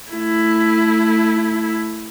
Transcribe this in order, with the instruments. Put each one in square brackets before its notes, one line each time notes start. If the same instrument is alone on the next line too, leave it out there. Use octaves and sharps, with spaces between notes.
[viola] A3 E4